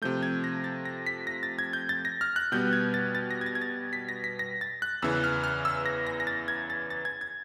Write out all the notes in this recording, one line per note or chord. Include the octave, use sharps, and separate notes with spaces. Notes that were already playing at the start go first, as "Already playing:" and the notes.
C3 F3 A3 G6
G#6
A#6
A6
A#6
B6
A#6
A6
G#6
G6
A6
A#6
F6
F#6
B2 G3 B3 G6
G#6
A6
A6
A#6
G#6
A6
G#6
A6
B6
A#6
B6
A#6
A6
F#6
E2 C#3 E3 E6
F6
F6
E6
A#6
A#6
A#6
A6
G#6
A6
A6
G#6
G#6